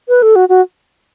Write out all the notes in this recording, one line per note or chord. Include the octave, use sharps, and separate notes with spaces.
B4
A4
F#4
F#4